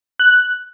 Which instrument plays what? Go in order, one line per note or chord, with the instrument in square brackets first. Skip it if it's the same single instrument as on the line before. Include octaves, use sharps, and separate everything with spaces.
[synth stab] F#6